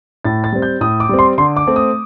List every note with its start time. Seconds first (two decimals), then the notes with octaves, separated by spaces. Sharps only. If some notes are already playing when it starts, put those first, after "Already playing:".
0.25 A2 A6
0.44 A6
0.52 G3 C4
0.62 G6
0.81 A2 D#6
1.00 D6
1.09 G3 C4
1.19 C6
1.38 D3 C6
1.57 D6
1.67 A3 C4
1.76 D#6